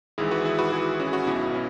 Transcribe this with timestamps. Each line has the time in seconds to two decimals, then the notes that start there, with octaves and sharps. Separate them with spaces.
0.18 G#1 G#2 E3 E4 G#4
0.31 F#4 B4
0.45 E4 G#4
0.58 F#4 B4
0.72 E4 G#4
1.00 C#4 F#4
1.07 G#4
1.13 C#4 F#4
1.27 B1 B2 B3 E4
1.54 C#4